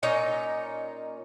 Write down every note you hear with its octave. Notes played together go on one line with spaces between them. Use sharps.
A#2 C#4 D#4 C#5